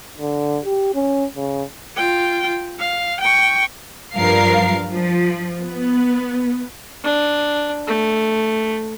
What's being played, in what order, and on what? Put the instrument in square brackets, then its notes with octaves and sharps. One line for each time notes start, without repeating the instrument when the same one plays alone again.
[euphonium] D3
G4
C#4
C#3
[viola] F4 G5
F5
G5 C#6
[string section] G2 F3 A#4 F5 C7
F3
B3
[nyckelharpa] D4
A3